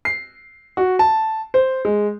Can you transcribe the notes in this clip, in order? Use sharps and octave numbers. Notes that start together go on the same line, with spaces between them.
C7
F#4
A5
C5
G#3